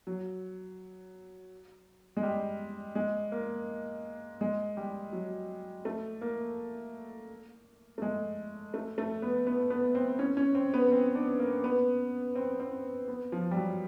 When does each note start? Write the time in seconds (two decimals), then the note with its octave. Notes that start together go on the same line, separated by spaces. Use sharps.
0.07 F#3
2.17 G#3
2.23 G3
2.95 G#3
3.32 A#3
4.41 G#3
4.77 G3
5.12 F#3
5.85 A3
6.21 A#3
7.98 A3
8.02 G#3
8.74 A3
8.98 A3
9.22 B3
9.47 B3
9.70 B3
9.95 C4
10.19 C#4
10.37 C#4
10.55 C4
10.74 B3
10.92 C4
11.15 D4
11.40 A#3
11.64 B3
12.35 C4
12.60 C4
13.08 B3
13.32 F3
13.51 G3
13.56 F#3